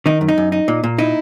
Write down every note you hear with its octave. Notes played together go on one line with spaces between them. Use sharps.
D#3 D#4
F#2
D#4
F#2
D#4
A#2
A#2
D#4 E4